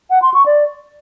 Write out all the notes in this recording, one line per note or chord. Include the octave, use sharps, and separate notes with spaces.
F#5
C6
C#6
D5